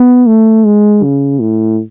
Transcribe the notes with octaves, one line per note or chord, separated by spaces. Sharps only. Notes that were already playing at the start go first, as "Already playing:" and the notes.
Already playing: B3
A3
G#3
C#3
A2